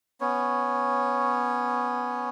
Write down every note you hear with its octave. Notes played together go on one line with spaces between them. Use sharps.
B3 C#4 C#5